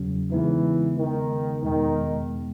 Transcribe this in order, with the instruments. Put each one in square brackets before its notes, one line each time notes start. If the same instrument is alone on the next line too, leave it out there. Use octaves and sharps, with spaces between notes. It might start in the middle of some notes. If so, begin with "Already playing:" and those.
Already playing: [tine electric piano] E2 C#3 F#3 C#4
[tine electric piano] C#3 G#3 B3 D#4 [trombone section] E3
[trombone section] D#3
[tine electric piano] E2 B2 G#3 B3 [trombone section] D#3